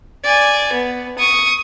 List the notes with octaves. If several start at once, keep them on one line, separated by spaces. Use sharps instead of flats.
D5 G#5
B3
C#6 D#6